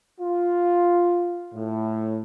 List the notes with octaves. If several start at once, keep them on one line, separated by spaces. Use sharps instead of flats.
F4
A2